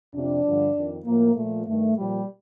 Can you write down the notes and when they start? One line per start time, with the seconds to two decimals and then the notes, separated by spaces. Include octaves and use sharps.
0.15 F2 C3 F3 D4
0.45 G2 D3 F3
0.76 F2 D#3
1.06 A2 F3 A#3
1.36 A#2 F3 A3
1.67 G2 D#3 A3
1.97 A#2 F3 G3